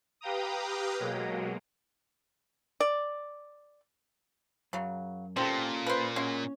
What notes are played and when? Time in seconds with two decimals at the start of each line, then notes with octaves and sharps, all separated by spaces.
0.21 G4 B4 F5 G5 A#5 D#6
0.99 B2 F#3 G#3 A#3
2.80 D5
4.73 F#2 C#3 F#3
5.37 A#2 C4 C#4 G4 A4
5.87 B4 C5
6.16 G#3 C#4 F#4 C#5